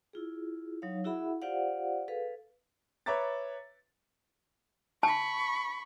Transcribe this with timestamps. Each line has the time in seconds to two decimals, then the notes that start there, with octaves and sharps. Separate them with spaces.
0.13 E4 F4 G#4
0.82 F#3 D#4 C#5 F5
1.04 E4 F#4 G#4 E5 F#5 B5
1.42 F4 G4 C5 D5 F5 F#5
2.08 G#4 A4 B4 F5
3.06 B4 C#5 E5 A#5 D6 A6
5.03 A5 B5 C#6